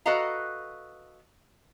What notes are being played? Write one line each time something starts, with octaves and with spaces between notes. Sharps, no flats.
F#4 A4 B4 D#5 F5 A#5